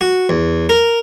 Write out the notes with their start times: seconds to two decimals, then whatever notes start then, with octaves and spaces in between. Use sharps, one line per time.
0.01 F#4
0.29 E2
0.69 A#4